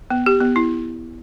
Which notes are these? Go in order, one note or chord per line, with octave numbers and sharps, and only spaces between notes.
B3
G4
B3
E4